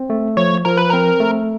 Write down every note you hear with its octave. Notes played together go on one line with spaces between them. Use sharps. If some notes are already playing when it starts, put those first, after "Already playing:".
Already playing: C4
A3
F3 C#5
F3 A#4
B4
C4 A#4
A3